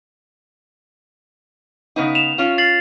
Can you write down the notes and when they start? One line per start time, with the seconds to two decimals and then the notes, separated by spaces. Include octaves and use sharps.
1.96 C#3 B3 D#4
2.15 E7 F7
2.38 C#4 F4
2.58 A6 C7 F#7